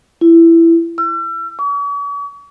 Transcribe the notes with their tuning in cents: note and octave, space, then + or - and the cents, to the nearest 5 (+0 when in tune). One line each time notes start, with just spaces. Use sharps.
E4 +15
E6 +40
C#6 +45